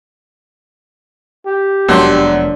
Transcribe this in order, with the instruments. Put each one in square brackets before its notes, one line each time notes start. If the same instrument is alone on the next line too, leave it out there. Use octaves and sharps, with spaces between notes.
[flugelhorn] G4
[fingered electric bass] F1 G#3 B3 [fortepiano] F#2 C6 [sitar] D4